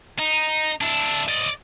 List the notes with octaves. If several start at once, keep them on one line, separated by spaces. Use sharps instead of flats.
D#4
D4 E4
D5 D#5